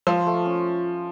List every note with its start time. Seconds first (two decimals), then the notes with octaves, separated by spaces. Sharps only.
0.07 F3 F4
0.27 A3
0.45 C#4